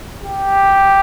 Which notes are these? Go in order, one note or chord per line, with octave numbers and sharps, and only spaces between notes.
G4